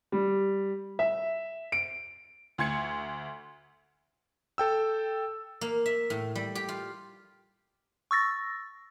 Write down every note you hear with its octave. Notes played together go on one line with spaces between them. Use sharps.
G3
E5
D7
D2 C6 G#6 C#7
A4 G5 E6
A#3
E5
A2
G3
G4
F4
C#6 E6 A6 A#6